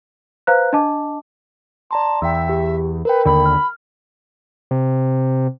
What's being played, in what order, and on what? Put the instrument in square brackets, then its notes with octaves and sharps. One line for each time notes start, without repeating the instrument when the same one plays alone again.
[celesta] B4 C5 F5 A#5 F#6
D4 D#5 A5 D6
[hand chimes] D5 A#5 C6 [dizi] A5
[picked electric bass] E2 [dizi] E5 [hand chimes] G5 E6
[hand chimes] G4
[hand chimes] A#4 G5 [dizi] B4
[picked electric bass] D#2 D3 [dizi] B5
[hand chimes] F6
[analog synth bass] C3